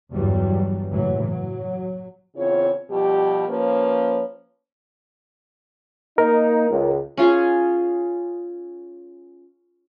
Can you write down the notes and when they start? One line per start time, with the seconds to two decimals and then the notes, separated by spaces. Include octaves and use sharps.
0.14 G1 E2 G2 E3 F#3 G3
0.91 F#1 A2 E3 F#3
1.22 F#3
2.36 E2 C#3 C4 F4 C#5
2.90 B2 F3 G3 G4
3.48 F3 A#3 C#4 B4 C#5
6.18 A#3 D#4 A#4
6.70 C#2
7.17 C#4 F4 G#4